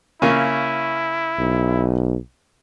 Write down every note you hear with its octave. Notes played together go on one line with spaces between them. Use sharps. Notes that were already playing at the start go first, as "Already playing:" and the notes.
C#3 A#3 C#4 E4
B1